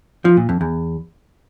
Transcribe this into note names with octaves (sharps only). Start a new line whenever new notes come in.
F3
A#2
F2
E2